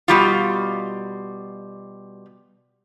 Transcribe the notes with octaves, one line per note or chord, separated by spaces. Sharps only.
B2 G3 F4